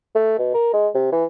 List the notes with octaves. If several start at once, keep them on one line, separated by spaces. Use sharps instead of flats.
A3
B2
A#4
G#3
C3
E3